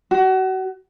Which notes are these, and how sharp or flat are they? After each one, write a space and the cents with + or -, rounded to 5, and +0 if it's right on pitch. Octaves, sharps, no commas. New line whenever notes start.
F#4 +30